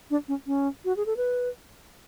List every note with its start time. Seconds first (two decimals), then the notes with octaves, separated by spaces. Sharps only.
0.10 D4
0.28 C#4
0.47 C#4
0.85 F#4
0.97 G#4
1.06 A4
1.17 B4